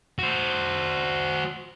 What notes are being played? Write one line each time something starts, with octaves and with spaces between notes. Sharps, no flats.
F#4 C5